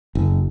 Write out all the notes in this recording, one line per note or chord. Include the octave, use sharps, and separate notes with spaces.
F#1